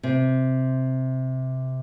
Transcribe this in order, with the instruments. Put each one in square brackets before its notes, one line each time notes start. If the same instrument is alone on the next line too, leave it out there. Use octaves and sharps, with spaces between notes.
[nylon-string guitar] C3